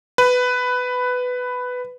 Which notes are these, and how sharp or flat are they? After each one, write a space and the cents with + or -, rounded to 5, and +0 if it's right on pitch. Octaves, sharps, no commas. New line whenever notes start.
B4 +10